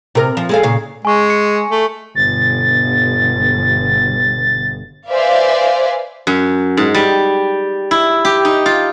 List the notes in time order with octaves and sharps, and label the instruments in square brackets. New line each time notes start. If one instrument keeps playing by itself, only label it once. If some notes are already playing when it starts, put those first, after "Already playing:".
[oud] C3 A#4
F3
G#3 A4 F5
A#2 C#3 F5
[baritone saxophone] G#3 [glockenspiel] G#5 C#6
[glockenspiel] C#7
[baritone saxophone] A3
[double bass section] G1 B2 [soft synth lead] A6
[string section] B4 C5 D5 E5 F5 G#5
[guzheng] F#2
G#2
G3
E4
G4
D#4
F4